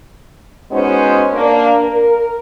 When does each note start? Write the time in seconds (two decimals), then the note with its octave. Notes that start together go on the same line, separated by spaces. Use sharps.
0.72 G#3 B3 C#4 D#4 F#4 C5
1.33 A#3 D4
1.85 A#4